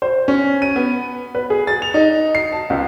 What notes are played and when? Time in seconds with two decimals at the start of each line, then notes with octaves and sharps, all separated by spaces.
0.02 C5
0.28 C#4
0.62 D#7
0.76 B3
1.35 B4
1.50 G#4
1.67 A6
1.82 F7
1.94 D#4
2.35 C7
2.52 A5
2.70 C#2